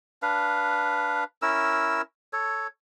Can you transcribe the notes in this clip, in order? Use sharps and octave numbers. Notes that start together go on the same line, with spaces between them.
D4 B4 F5
C#4 E4 A#4 E6
A4 C#5